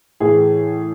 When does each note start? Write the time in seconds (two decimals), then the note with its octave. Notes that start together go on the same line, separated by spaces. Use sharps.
0.20 A2 E3 G#4